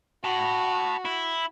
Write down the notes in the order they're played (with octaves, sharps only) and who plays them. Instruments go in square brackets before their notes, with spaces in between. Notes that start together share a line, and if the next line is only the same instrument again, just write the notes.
[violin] F#4 [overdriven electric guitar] A5 B5
[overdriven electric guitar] E4